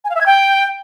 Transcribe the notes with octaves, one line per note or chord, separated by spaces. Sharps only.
G#5
F5
E5
G#6
G5